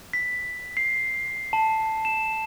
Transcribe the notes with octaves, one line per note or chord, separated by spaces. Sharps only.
B6
C7
A5
E7